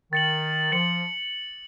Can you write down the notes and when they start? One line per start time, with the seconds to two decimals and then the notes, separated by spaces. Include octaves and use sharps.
0.12 D#3 A6 C#7 F#7
0.72 F3 A6 C#7 F#7